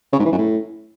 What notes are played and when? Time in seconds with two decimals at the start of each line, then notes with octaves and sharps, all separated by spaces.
0.13 C#3
0.19 G#2
0.25 E3
0.32 F#2
0.38 A2